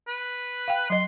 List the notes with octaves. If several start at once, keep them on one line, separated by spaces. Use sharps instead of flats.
B4
F5 G5
F#3 D#5 C6